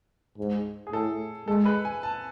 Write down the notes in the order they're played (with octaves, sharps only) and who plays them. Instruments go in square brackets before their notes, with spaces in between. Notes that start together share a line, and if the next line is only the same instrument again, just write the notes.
[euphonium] G#2
[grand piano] G#4
[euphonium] A2 [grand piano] A4
[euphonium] G#3 [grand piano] A4
[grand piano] B4
G#5
A5